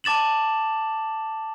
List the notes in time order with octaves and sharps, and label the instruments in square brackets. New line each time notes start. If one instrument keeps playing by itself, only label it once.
[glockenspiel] A5 D6 A6 E7 F#7